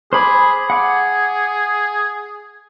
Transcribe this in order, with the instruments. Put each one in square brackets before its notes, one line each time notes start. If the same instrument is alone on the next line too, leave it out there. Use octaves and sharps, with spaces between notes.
[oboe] G#4 [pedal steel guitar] C5 B5 D6
[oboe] G#4 [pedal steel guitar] F#5 D6